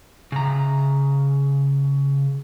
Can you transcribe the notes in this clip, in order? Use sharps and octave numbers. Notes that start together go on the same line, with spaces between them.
C#3 A#5